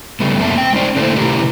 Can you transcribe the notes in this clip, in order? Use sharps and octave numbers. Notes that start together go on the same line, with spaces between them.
C#3 F#3 G3 A3 B3
F#2 A#3 B3 E5 A5
C4 G5
G#3 C#4 D#4 C5 D5
D3 A3 A#3 D4 E4 C5
C3 D#3 A3 E4 G4 A#4